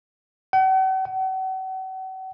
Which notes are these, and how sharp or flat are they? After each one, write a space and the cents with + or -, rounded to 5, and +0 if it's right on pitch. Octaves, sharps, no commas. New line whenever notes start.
F#5 +45
F#5 +40